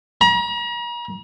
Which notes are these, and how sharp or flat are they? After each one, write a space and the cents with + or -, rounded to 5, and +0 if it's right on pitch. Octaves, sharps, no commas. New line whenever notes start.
A#5 +40